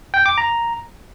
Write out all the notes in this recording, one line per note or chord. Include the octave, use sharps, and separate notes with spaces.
G5
D6
A#5